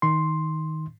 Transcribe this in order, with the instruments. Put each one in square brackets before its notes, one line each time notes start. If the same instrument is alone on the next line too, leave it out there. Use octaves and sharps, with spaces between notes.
[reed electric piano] D#3 C6